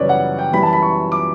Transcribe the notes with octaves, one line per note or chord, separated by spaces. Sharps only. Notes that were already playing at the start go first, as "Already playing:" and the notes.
Already playing: F#2 C#3 E3 G3 B4 C#5 D5
F#5
G5
F#2 E3 G3 B5
A5
B5
C#6
D6